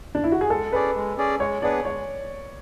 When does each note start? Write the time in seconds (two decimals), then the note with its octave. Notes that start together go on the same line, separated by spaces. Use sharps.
0.15 D4
0.24 E4
0.32 F#4
0.41 G#4
0.50 G#3 A4
0.72 C#4 G#4 B4 D5
0.95 G#3
1.18 C#4 G#4 D5
1.40 G#3 C#5
1.62 B3 D4 G#4 B4 D5
1.85 G#3 C#5